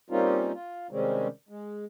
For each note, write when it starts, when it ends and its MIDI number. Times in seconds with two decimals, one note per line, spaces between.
0.10 0.52 55
0.10 0.52 58
0.10 0.52 60
0.10 0.52 61
0.10 0.52 63
0.10 0.52 65
0.54 0.87 65
0.91 1.28 48
0.91 1.28 51
0.91 1.28 55
0.91 1.28 56
0.91 1.28 60
0.91 1.28 61
1.49 1.85 56